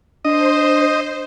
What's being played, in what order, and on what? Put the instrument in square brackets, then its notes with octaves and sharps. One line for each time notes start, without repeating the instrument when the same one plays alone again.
[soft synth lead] D4 [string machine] C5 [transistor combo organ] D#5